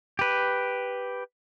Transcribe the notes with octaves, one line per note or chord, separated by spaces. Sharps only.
G4 B4